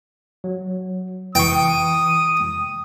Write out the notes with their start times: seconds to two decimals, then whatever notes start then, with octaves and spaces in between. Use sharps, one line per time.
0.44 F#3
1.35 E3 G5 C#6 D#6